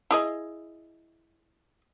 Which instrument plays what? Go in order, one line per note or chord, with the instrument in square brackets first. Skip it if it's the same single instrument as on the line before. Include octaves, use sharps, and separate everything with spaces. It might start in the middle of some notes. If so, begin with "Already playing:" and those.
[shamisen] E4 G#4 D#5